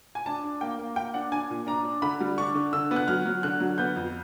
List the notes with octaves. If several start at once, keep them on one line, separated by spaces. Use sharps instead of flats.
G#5
D4 A5
D4
A#3 G5
A#3
A#3 G5
D4 F#5
D4 G#5
A#2
D4 A#5
D4
D3 B5
G3
D4 C#6
D3
D3 E6
B3
F#6
F#3 F6
F#3
D3 F#6
F#3
B3 G6
F2